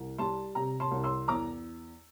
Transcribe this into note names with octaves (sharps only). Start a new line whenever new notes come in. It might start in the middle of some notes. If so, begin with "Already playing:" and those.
Already playing: C2
G3 A5 C6
C3 G5 A#5
A5 C6
C2
C6 E6
E2 A#5 D6